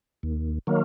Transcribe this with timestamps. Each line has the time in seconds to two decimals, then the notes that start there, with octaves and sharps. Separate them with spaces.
0.23 D#2
0.67 D#3 F#3 A#3